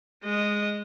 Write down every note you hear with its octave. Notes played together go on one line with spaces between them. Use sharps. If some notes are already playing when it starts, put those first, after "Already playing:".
G#3 D#5